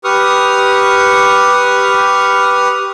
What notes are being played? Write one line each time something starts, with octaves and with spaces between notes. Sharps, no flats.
G4 B4 C#6 D#6 F6